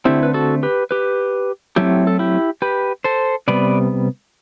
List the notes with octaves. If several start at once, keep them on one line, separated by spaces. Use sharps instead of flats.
D3 A3 C4 E4 G4
B4
F#4 A4
G4 B4
G4 B4
A2 F#3 A3 C4 E4 G4
A4
E4 G4
G4 B4
A4 C5
C3 G3 B3 B4 D5